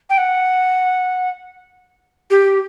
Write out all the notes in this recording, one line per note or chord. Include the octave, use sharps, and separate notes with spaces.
G5
F#5
G4